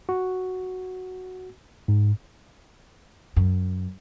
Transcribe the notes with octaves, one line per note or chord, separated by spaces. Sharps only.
F#4
G#2
F#2